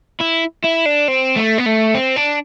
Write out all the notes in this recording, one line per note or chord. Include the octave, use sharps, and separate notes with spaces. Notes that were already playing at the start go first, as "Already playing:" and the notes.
E4
E4
D4
C4
A3
B3
A3
C4
D4